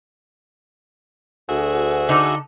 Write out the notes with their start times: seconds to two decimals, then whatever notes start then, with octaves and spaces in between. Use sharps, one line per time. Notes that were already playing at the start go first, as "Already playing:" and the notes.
1.49 D2 F#4 G#4 E5
2.09 D3 D#4 A4